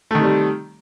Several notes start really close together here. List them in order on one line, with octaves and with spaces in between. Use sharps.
A3 D#3 C3 G3